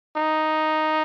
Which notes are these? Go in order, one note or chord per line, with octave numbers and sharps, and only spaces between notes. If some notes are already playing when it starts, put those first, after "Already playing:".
D#4